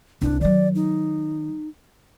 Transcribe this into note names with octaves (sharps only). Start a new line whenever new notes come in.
C2 C#4 D4
D#3 F#3 D5
D#4